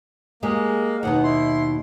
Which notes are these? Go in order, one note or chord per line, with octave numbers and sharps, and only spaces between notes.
G#3 A#3 G4 G#4
D#2 B2 D#4 F#5
E4 C6